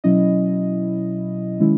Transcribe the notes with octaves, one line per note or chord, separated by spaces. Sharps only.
B2 F#3 C#4 E4 D#5
D#3 G#3 C#4 E4